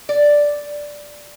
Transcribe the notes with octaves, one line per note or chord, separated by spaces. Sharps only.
D5